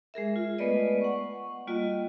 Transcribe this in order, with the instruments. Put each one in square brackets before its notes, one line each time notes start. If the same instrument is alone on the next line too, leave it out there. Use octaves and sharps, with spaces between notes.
[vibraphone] G#3 G#4 A#4 E5
F4
G#3 A3 B3 B4 D5 D#5
F#5 C#6
G3 A#3 F4 F#4 D#5